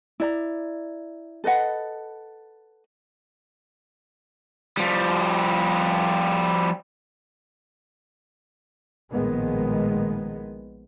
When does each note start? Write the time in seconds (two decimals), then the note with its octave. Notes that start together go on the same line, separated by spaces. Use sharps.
0.20 E4 D5 A#5
1.44 A4 B4 D#5 F#5
4.77 F3 G3
9.12 A#1 A2 D#3 G#3 B3